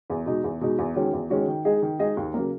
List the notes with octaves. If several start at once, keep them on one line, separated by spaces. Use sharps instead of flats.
E2
B2 G#3 D#4
E2
B2 G#3 D#4
E2
D#3 G#3 C#4 F#4
E2
D#3 G#3 C#4 F#4
D#3
G#3 D#4 G#4 D#5
D#3
G#3 D#4 G#4 D#5
D#2
C#3 F#3 A#3